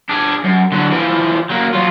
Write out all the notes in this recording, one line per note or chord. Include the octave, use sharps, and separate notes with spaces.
D4 G#4
F#2
D3 F#3
E3 F3
F#3 A#3
F#3 F4